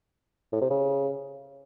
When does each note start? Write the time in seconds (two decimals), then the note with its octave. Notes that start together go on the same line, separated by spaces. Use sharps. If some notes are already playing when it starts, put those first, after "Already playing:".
0.53 A2
0.61 C3
0.70 C#3